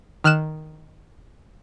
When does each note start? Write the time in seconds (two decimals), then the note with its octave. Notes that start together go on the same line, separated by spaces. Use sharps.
0.24 D#3 F6 F#6 E7